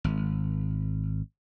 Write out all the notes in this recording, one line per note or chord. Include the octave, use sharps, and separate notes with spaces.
G#1